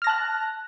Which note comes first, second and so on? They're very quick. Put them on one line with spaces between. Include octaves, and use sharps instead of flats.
F6 A#6 A5 F#6